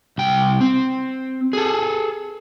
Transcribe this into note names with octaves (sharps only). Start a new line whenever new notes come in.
C2 G5
C4
G#4 A4